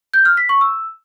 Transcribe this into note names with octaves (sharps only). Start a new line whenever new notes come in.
G6
F6
B6
C#6
E6